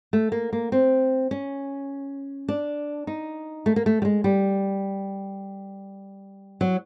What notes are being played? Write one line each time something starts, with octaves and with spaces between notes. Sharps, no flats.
A3
A#3
A#3
C4
C#4
D4
D#4
A3
A#3
A3
G3
G#3
G3
F#3